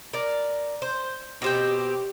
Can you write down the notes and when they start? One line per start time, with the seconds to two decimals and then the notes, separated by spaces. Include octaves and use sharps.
0.13 A#4 D5
0.82 C5
1.42 B2 C4 G4 G5